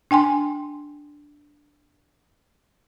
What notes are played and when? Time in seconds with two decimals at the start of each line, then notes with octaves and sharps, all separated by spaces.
0.11 D4 G5 G#5 C6